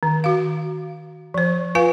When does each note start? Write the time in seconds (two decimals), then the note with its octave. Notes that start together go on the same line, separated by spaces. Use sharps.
0.03 D#3
0.24 F#4 F5
1.34 F3 C5
1.75 F4 B4 F5 G#5